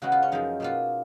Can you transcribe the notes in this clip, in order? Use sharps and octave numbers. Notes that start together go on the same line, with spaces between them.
C#3 G#3 B3 F#4
F4
C#4
F#2 F3 G#3 D#4
B2 A#3 F4